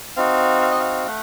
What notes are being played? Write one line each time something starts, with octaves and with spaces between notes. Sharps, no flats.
C4 D#4 F#4 F5
F5
D#5
F5
A3 F#5